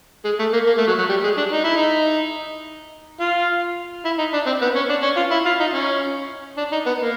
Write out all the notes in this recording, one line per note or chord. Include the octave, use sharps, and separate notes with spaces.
G#3
A3
A#3
A#3
A3
F#3
F#3
G3
G#3
D4
D#4
E4
D#4
F4
E4
D#4
D4
C4
B3
C#4
D4
C#4
F4
E4
F4
D#4
C#4
D4
D#4
B3
A#3